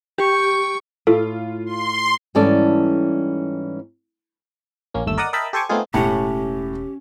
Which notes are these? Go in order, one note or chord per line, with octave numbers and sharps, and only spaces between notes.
G4 C#6
A2 F4 A4
C6
G#2 E3 G3 C#4 A4 D5
A#1 A#3 C#4
G1 D#2 A3 E6
A#4 D5 D#5 F#5 D#6
A#4 D#5 E5 G5 A5 B5
G4 A4 C5 G#5 C#6 D6
A3 B3 C4 D#4 F4 G#4
E1 A2 C#4 G4 F#5